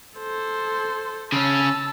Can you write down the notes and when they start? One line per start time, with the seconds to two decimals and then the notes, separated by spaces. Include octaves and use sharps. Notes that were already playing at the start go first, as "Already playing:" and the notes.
0.19 A4 C5
1.32 C#3 C#4 A5 E6